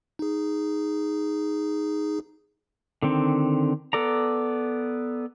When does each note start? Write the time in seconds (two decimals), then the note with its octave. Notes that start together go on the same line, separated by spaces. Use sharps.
0.19 D#4 G#4
3.03 D3 D#3 C4
3.93 B3 A4 D5 A#5